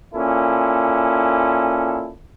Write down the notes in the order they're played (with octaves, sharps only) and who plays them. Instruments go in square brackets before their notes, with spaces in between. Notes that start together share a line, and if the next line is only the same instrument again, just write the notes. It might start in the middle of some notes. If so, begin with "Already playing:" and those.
[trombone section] A#2 C#4 E4 A4